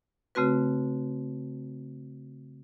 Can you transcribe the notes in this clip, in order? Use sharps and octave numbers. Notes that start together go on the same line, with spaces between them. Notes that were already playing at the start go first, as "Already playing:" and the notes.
C#3 A3 C4 F#4 B4